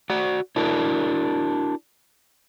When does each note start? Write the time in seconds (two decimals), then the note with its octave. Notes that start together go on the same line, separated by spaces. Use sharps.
0.10 F#4 D5 F#5
0.56 D4 E4 F#4 A#4